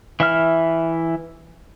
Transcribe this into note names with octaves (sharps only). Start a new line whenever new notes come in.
E3 E5 F6